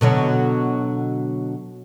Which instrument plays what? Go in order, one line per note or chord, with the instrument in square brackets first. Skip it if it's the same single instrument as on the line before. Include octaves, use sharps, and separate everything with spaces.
[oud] B2 D3 F#3